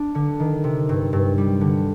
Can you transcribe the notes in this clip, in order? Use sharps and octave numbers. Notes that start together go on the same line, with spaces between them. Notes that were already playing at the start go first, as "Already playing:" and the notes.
Already playing: D4
D3
D#3
C3
G2
G2
G3
D3